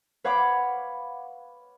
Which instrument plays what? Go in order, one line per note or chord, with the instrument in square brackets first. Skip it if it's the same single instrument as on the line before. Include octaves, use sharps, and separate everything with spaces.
[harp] B4 C#5 F5 F#5 B5 D6